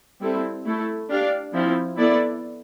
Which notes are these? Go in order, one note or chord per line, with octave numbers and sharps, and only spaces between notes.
G3 C4 E4 A4
A3 E4 A4
D4 G4 D5 F5
F3 C4 E4
B3 E4 A4 D5